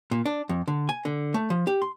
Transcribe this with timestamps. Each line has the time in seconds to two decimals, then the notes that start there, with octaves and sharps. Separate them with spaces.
0.11 A#2
0.26 D4
0.49 F2
0.68 D3
0.89 G#5
1.05 D3
1.34 A3
1.50 F3
1.67 G4
1.82 C6